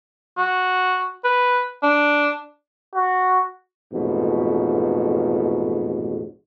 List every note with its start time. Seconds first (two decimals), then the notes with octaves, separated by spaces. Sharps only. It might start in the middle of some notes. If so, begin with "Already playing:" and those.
0.38 F#4
1.24 B4
1.83 D4
2.94 F#4
3.93 A1 F2 G#2 B2